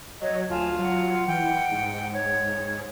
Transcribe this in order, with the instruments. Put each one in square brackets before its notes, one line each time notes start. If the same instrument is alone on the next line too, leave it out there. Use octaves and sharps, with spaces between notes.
[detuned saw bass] F#3 [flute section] C#5 D#5
[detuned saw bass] D2 [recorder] F4 [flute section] G#5 A5
[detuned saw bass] F#3 [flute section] F#5
[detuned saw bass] E3 [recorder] G5
[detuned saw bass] G#2
[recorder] C#5